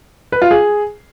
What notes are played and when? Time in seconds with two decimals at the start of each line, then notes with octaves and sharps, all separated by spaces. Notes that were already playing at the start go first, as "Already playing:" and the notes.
0.32 B4
0.42 F4
0.51 G#4